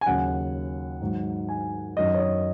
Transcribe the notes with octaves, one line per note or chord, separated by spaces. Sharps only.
G#5
D#2 C#3 F#3 F#5
G#2 D#3 F#3
G#5
F#2 D#3 F#3 D#5
C#5
D#5